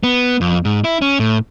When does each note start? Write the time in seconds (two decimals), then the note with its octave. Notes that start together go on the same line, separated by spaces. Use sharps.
0.03 B3
0.41 F2
0.65 G#2
0.84 E4
1.02 C#4
1.20 A2